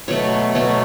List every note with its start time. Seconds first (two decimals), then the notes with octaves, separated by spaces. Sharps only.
0.08 B2 F#3 A3 C#5
0.55 B2 F#3 A3 C#5